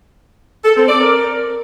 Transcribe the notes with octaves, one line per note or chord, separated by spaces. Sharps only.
A4
C4
D5
A#4